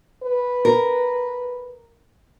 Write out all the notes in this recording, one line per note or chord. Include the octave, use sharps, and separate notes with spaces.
B4
A#4